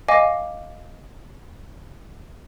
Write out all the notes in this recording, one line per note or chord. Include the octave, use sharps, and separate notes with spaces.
D#5 F5 G#5 D6